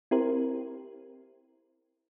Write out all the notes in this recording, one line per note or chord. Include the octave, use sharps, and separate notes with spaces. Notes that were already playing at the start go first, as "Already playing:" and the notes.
C4 E4 G4 A#4 C5